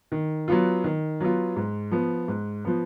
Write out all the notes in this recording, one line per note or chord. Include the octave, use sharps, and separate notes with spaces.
D#3
F#3 B3 F4
D#3
F#3 B3 F4
G#2
F3 B3
G#2
F3 B3